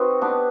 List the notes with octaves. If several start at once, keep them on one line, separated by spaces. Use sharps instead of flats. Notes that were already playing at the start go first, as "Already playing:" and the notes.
Already playing: C4 D#4 F#4 B4
B3 D4 G4